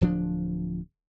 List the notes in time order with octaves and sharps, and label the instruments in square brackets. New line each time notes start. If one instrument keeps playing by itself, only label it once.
[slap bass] D1 F3 D4